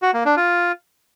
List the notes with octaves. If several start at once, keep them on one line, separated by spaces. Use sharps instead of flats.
F#4
A#3
D4
F4